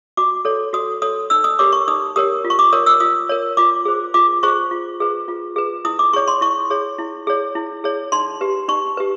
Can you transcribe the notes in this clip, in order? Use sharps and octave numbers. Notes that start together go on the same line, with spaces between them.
F#4 D6
A4 C#5
F#4 D#6
A4 C#5 D#6
D#4 E6
D#6
G4 A#4 C#5 D6
C#6
D#4 D#6
G4 A#4 C#5 D#6
F4
C#6
D6
A#4 C#5 D#6
E6
F4 D#6
A#4 C#5
F4 D6
G#4 C5
F4 D6
G#4 C5 C#6
F4
G#4 B4
F4
G#4 B4
E4 D#6
D6
G#4 C#5 C#6
C6
E4 C#6
G#4 C#5
E4
G#4 C#5
E4
G#4 C#5
D#4 C6
G4 B4
D#4 C#6
G4 B4